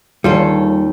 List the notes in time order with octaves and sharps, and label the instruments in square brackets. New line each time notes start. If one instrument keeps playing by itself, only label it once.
[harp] D#2 C#4 [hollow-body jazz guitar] G3 F4 A4